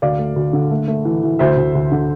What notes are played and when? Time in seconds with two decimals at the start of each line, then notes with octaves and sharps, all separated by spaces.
0.02 D2 D5 F5
0.19 A3
0.36 D2
0.53 D3
0.71 A3
0.88 A3
1.05 E3
1.23 E3
1.39 D2 C5 E5
1.57 D2
1.75 D2
1.92 D3